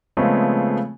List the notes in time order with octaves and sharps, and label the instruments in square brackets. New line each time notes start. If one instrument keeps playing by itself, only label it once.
[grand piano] C#3 F3 G#3 A3 B3 C4